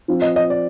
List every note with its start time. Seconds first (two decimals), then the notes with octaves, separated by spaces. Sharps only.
0.08 F3 C4 F4
0.22 D#5
0.36 D#5
0.50 D5